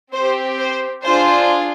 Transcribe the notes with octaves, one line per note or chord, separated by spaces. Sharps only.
C4 G4 C5
C5
D4 F4 G#4 C5